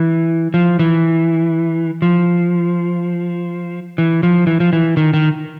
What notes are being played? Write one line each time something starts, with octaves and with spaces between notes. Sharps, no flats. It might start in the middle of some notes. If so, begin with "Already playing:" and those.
Already playing: E3
F3
E3
F3
E3
F3
E3
F3
E3
D#3
D#3